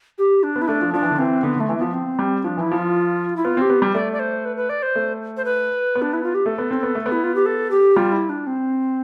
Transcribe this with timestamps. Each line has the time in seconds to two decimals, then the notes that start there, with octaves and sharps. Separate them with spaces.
0.18 G4
0.43 D4
0.56 B3
0.62 E4
0.68 A3 D4
0.81 F3
0.94 F3 D4
1.02 E3
1.11 D3
1.19 E3 C4
1.43 D3 B3
1.56 D3
1.60 A3
1.69 E3
1.78 F3 B3
1.93 C4
2.19 G3
2.44 F3 D4
2.57 E3 E4
2.71 F3
2.78 F4
3.36 E4
3.45 B3 F4
3.57 C4
3.61 G4
3.70 B3
3.82 G3
3.94 A3 D5
4.13 D5
4.19 C5
4.45 B4
4.57 B4
4.69 D5
4.83 C5
4.95 A3
5.37 C5
5.45 B4
5.95 B3
6.02 D4
6.14 E4
6.23 F4
6.34 G4
6.46 A3 A4
6.58 B3
6.71 C4
6.83 B3
6.95 A3
7.06 B3
7.12 E4
7.24 F4
7.35 G4
7.46 A4
7.71 G4
7.96 G3 F4
8.12 E4
8.29 D4
8.47 C4